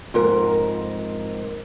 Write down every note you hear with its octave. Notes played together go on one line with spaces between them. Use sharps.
F2 G#2 A#4